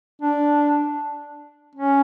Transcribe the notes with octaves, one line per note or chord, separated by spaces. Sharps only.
D4
C#4